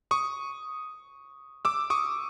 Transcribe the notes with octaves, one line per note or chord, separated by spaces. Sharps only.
C#6 D#6
D6 E6
C#6 D#6